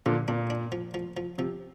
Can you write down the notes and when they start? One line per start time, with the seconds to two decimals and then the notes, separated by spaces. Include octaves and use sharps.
0.06 A#2 D3 F3
0.28 A#2 D4
0.50 D4
0.72 F3
0.94 F3
1.17 F3
1.38 C3 F3